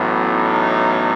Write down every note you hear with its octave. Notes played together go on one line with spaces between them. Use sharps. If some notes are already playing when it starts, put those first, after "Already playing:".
Already playing: A1 A2 F#3 B3
D#4